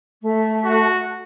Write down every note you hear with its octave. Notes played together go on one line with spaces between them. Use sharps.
A3
F#4